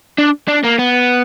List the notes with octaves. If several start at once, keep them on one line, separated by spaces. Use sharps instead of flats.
D4
D4
A#3
B3